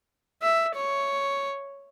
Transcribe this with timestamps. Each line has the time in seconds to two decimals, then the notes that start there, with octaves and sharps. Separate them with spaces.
0.42 E5
0.76 C#5